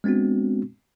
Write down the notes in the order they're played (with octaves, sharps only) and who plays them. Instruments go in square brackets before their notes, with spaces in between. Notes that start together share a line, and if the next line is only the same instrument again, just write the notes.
[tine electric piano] G#3 B3 C4 D4 F#4